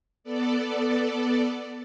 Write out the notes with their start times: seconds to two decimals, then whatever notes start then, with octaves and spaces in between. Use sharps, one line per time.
0.24 B3 A4 D5